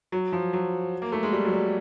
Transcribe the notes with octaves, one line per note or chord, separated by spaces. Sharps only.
F#3
F3
F#3
A#3
A3
G#3
G3
F#3
G3